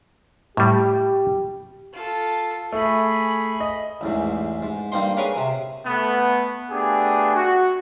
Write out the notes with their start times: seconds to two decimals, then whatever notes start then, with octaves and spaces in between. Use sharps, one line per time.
0.57 A2 G3 G4
1.93 F4 A4
2.72 A3 G#4 B5
3.60 D#5
4.01 A1 E2 G#2
4.62 G#2
4.92 G2 A#3 C4 D#4 C6
5.17 G#4 A#4 B4 C#5 F5 G#5
5.37 C3
5.86 A3 B3
6.71 A3 B3 D4 G4 G#4
7.36 F#4